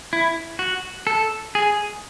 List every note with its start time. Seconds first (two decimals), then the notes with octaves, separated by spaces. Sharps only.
0.13 E4
0.59 F#4
1.07 A4
1.55 G#4